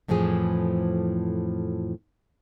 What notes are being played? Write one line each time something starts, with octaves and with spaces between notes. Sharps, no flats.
F2 A2 E3 F3 G#4